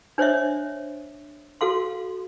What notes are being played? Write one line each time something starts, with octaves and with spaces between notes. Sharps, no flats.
D4 C5 C#5 D#5 E5
F#4 A4 F5 C6